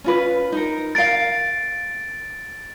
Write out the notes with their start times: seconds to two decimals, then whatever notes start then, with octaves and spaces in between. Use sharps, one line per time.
0.04 C#4 F4 B4
0.52 D#4 A#4
0.95 A#4 F5 A6 D7